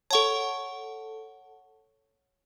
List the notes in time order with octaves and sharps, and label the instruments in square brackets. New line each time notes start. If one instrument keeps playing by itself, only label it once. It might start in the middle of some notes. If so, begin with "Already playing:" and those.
[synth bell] A4 F#5 A5 [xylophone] C#5 C#6